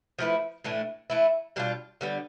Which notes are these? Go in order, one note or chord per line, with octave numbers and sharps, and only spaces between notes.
F3 A3 E4 B4
A2 E3 A3 D4
E3 A3 E4
B2 G3 D4 F4
D3 G3 B3